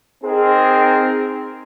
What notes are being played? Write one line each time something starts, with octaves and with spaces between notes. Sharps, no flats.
C4 D#4 G#4 A#4